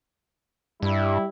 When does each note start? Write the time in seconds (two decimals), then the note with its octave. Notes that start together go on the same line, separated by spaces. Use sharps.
0.82 G2 G3 E4